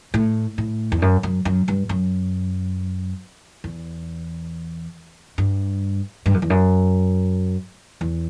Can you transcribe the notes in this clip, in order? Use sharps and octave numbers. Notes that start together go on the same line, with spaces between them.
A2
A2
E2
F#2
F#2
F#2
G2
F#2
E2
G2
G2
F#2
E2
F#2
E2